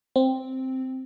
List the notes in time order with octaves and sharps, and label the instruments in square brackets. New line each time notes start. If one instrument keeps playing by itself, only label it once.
[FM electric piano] C4